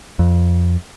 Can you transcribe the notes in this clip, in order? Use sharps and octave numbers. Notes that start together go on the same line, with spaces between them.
F2